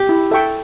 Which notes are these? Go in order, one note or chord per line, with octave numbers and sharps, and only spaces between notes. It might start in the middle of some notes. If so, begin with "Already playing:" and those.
Already playing: G4
E4
A4 E5 G5 C#6